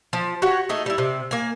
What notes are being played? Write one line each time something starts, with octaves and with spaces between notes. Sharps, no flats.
F3
F#4 G4 C#5 F#5
A3 D#4 G#4
G3 E4
C3
A#3 G#5